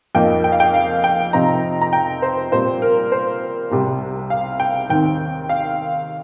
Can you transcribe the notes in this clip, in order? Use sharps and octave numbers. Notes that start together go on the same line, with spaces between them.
F2 F3 A#3 D#4 G5
G5
F5
G5
F5
G5
C3 F3 C4 D#4 A#5
A#5
G5
C5
A#2 G3 C4 C5
A#4
C5
C2 C3 G3
F5
G5
D#2 D#3 C4 G5
F5